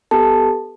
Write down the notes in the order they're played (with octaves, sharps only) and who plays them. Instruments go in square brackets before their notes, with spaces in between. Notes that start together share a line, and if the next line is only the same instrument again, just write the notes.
[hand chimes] B3 G4 A4 A5